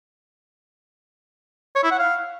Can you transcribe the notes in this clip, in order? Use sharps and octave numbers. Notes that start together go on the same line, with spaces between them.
C#5
E4
F#5
F5